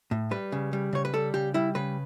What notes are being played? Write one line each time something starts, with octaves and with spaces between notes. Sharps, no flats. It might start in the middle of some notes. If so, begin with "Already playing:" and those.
A2
G3 B4
C#3
G3
C#3 C#5
B4
G3 A4
C#3 G4
G3 E4
C#3 B4